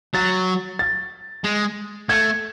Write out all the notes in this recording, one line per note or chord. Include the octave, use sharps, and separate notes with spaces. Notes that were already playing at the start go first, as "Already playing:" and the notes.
F#3 A6
A6
G#3
A3 G#6